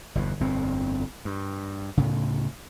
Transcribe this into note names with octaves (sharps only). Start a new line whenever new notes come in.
G1 E2 B2
G1 F2 A#2 C4
G2
D2 A2 C#3